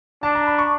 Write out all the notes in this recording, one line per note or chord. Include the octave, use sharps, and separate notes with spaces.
D4 A5
A#5
B5
C#6